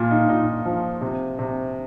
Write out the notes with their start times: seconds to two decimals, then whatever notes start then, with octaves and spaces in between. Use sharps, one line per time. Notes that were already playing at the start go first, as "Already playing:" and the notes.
Already playing: A#2 F4
0.11 D#4
0.29 A#2 D#4
0.65 F3
1.01 C3
1.39 C3